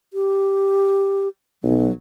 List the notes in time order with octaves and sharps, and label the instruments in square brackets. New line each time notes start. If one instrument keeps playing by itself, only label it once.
[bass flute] G4
[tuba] B1 [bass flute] F#3